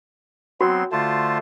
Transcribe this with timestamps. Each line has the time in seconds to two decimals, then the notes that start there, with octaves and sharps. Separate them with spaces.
0.61 F#3 B3 C4 F#4 C6
0.92 D3 A3 F4 C5 A5